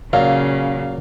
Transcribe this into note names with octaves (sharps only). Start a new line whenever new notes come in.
A#2 C#3 F#3 F5